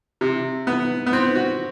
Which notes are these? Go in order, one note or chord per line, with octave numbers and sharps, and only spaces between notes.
C3
B3
B3
C4
F#4